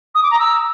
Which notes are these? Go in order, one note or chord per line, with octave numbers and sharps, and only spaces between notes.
D#6
D6
A#5
E6